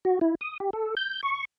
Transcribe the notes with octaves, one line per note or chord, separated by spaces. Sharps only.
F#4
E4
D#6
G4
A4
G6
C#6